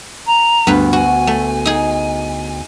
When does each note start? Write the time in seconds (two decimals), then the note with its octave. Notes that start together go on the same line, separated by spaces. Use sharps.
0.26 A#5
0.67 D2 G2 B3 B4
0.93 F#4 G#5
1.27 A3
1.65 D#4 G#4